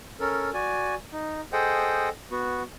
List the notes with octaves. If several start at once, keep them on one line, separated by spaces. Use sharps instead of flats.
C#4 A4 A#4
F#4 D5 G#5
D#4
G#4 A4 C5 D#5 F#5 G5
B3 F#4